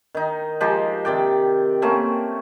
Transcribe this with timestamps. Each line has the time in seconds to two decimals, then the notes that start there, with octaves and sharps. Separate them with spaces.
0.15 D#3 D#4
0.61 F3 G#3 D#4 G4
1.05 C3 D#3 D5 G5
1.82 A3 A#3 C4 C#4